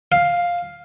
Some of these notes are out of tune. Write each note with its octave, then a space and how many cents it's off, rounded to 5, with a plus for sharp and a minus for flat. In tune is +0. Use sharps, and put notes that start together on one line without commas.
F5 +5